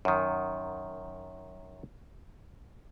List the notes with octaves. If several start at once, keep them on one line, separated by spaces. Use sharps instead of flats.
F#2 D#3